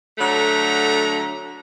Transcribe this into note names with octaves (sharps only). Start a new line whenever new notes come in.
D3 F#3 A3 A#5